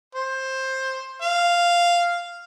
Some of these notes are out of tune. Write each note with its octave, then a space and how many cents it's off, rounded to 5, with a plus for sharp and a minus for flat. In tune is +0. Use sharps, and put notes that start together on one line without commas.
C5 +15
F5 -5